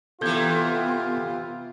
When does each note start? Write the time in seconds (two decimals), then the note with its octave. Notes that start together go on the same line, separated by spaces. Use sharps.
0.21 C3 E3 B3 F4 A4 G6 G#6